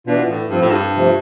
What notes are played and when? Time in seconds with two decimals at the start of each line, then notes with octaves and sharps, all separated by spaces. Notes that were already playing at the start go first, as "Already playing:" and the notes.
0.07 B2 E3 B3 D4 F4
0.29 A2
0.50 G2 F3 C4 F4
0.61 A2
0.71 G2
0.94 C3 F3 A3